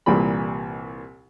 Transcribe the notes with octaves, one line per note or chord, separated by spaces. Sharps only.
C2 A#2 E3 G3 B5